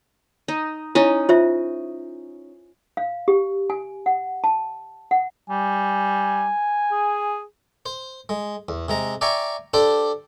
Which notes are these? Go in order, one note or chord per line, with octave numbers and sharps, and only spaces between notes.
D#4
C#4 D#4 E4
F4 C5 E5
F5
G4
G#5
F#5
A5
F#5
G3 G#5
G#4
C5
G#3
E2
C3 G#3 A#5
D5 E5 G5 G#5 A#5 C#6
D4 G4 A4 C5 D5